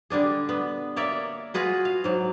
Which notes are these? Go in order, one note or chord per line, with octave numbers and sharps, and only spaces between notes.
D3 G3 D4 G#4
B3
A#3 C#5 D5 E5
F4 F#4 G#4 B4
F5
G#2 F#3